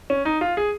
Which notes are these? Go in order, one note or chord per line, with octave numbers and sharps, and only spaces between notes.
C#4
D#4
F4
G#4